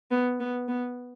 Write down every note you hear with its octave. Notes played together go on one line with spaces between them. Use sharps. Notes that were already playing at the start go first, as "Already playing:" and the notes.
B3
B3
B3